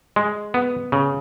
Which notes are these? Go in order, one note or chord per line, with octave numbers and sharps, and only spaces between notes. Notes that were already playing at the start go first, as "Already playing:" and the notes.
G#3
B3
C#3